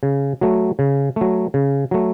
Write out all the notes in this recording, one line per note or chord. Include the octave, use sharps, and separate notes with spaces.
C#3
F#3 A3
C#3
F#3 A3
C#3
F#3 A3